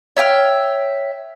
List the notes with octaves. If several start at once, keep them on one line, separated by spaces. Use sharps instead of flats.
C#5 E5 G5 F6